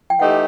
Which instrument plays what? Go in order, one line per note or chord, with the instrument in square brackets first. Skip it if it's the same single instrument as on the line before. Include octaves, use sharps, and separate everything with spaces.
[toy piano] G5
[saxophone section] E3 A3 D#4 G4 [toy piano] F#5